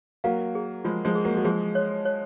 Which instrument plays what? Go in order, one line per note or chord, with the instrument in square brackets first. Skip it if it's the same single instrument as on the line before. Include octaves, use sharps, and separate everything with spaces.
[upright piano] F#3 A#3 [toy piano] F5
[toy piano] G#4
[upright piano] F3 G#3 [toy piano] F4
[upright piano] F3 G#3
[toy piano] G#4
[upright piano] F#3 A#3
F#3
[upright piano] F3 G#3 [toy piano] G#4
[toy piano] C#5
C#5